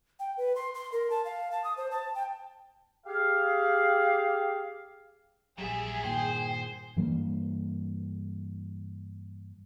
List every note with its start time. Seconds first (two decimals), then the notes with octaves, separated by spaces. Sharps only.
0.19 G5
0.38 B4
0.56 C6
0.75 C6
0.92 A#4
1.10 A5
1.25 F5
1.51 A5
1.64 D#6
1.77 C5
1.91 A5
2.15 G5
3.06 G4 G#4 F5
5.58 A#1 D#2 F#3 G3 G#4 E5
6.04 G2 A#2 D#3 C5 G5
6.96 G2 E3 G3 A#3